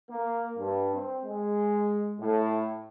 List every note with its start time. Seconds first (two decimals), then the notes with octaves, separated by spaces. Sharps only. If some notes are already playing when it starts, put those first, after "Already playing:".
0.11 A#3
0.58 G2
0.95 C4
1.25 G#3
2.20 A2